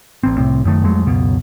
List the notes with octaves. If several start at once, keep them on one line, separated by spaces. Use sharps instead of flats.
A1 C4
C2 A2 C3 C4
F#1 F#2 D#3 A3
F2 F#3 G#3 A3
C#2 F#2 B2